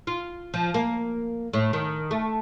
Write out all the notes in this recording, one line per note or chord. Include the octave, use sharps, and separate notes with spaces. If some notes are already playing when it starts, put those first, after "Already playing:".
F4
F3
A#3
A2
D#3
A3